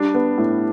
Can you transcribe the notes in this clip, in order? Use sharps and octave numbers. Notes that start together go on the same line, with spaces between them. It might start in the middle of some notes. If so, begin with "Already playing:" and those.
Already playing: G3 D4
B3
A2